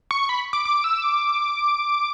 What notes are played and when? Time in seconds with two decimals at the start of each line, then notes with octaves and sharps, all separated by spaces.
0.11 C#6
0.29 B5
0.53 D6
0.65 D6
0.84 E6
1.02 D6